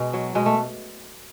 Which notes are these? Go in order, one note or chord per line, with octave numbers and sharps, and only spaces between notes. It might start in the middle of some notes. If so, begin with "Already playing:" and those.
Already playing: B2 G#3
F#3
B2 G#3
A3